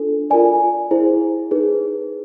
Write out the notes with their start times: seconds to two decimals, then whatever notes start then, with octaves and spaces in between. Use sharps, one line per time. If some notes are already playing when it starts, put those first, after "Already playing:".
Already playing: D4 F4 A4
0.30 F4 A#4 D5 G#5
0.91 E4 G#4 C5
1.51 D#4 G#4 B4